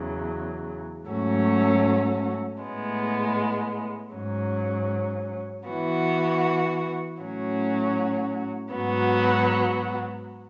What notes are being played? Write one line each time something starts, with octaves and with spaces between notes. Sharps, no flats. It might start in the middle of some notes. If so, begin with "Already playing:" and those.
Already playing: E2 C#3 F#3
G#2 F#3 A3 C#4 F#4
A2 G#3 B3
G#2 F#3 C#4
E3 B3 F#4
A2 F#3 C#4 F#4
G#2 F#3 B3 F#4